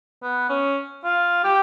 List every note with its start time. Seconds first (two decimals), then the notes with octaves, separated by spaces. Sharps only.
0.23 B3
0.49 C#4
1.04 F4
1.44 G4